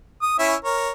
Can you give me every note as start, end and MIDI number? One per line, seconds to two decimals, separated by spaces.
0.22 0.39 87
0.39 0.55 61
0.39 0.55 64
0.39 0.55 76
0.65 0.91 70
0.65 0.91 73